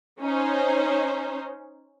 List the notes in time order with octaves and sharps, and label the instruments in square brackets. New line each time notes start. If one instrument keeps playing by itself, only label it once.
[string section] C#4 D#4 C5